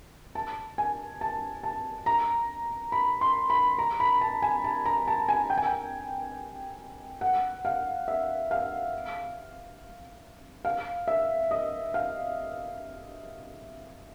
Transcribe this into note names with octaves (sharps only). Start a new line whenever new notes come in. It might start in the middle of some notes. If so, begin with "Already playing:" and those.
A5
G#5
A5
A5
A#5
B5
C6
B5
A#5
B5
A5
G#5
A5
A#5
A5
G#5
G5
G#5
G5
F#5
F5
E5
F5
F5
E5
D#5
F5